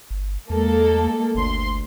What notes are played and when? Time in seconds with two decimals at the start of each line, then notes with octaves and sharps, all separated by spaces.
0.10 G1
0.50 E2 G#3 A#3 A4
1.35 G1 D2 C6